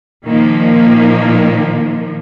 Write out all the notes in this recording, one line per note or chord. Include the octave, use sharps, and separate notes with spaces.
A#2 D#3 F3 A#3